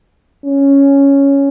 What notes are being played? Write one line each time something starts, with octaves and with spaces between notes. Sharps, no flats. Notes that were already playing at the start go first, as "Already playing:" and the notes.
C#4